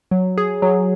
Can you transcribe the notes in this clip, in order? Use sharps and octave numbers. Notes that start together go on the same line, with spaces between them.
F#3
G#4
F#3